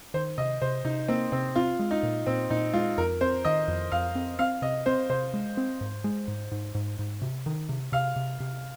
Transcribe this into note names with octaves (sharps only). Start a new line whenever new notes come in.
D#3 C5
C3 D#5
C3 C5
C3 D#4
A#3 C4
C3 C4
C4 F4
G#3
D#4
A#2
A#2 C4
A#2 D#4
G#3 F4
F2 A#4
C4 C5
D#3 D#5
F2
F2 F5
C4
C4 F5
C3 D#5
C4 C5
C3 C5
G#3
C4
G#2
G#3
G#2
G#2
G#2
G#2
C3
D#3
C3
C3 F5
C3
C3